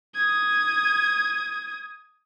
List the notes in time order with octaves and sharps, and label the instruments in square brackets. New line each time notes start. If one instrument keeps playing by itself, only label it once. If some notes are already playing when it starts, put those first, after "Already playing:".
[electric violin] D#6 G#6